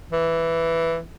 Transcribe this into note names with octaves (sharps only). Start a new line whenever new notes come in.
E3